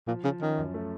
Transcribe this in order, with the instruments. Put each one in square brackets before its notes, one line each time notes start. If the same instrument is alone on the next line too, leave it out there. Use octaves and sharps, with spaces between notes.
[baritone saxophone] A#2 [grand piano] F3
[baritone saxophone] C#3 [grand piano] F3
[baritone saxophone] D#3 [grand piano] C#4
[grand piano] F#2
A3